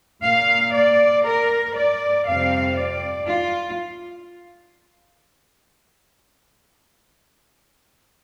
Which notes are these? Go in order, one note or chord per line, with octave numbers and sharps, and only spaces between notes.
A#2 A#3 F5
D5
A#4
D5
F2 C3 G3 C4 F5
D5
F4